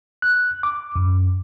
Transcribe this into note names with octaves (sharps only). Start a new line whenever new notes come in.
F#6
D6
F#2